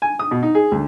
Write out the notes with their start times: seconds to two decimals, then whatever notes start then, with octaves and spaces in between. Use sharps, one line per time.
0.02 G#5
0.19 D#6
0.31 B2
0.43 D#4
0.55 G#4
0.71 D2